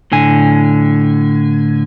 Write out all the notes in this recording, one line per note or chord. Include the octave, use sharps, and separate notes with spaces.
A2 D3 G#5